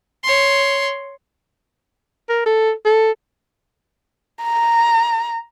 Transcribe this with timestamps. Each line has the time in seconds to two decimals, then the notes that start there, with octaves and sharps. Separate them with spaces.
0.23 C#5 C6
2.30 A#4
2.46 A4
2.85 A4
4.43 A#5